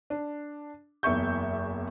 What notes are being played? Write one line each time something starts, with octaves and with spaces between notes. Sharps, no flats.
D4
F#1 E2 E5 C#6 G6